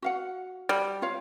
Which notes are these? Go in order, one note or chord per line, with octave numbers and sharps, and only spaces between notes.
F#4 F5 F#5
G3
F4 C#5 F5